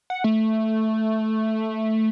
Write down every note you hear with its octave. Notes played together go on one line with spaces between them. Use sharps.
F#5
A3